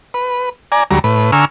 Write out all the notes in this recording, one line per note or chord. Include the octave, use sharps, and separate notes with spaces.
B4
D5 G#5 A#5
D2 F#3 G3 A#5
A2 B4
D3 G#5 A#5 C#6 E6 F6